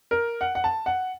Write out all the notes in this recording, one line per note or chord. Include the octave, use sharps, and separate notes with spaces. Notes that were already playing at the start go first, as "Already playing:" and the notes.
A#4
F#5
F#5
A5
F#5